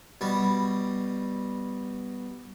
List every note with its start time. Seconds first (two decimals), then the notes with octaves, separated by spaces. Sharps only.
0.21 B2 G3